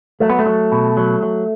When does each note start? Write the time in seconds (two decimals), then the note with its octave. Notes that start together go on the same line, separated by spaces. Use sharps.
0.20 F#3 A3
0.30 B3
0.39 A3
0.46 F#3
0.72 B2
0.97 F#3
1.23 F#3